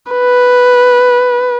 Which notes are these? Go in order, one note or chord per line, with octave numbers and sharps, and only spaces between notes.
B4